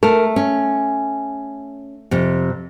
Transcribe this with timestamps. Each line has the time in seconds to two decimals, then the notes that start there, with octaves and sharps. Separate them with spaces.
0.03 A3 A#4
0.36 C#4
2.11 F2 C3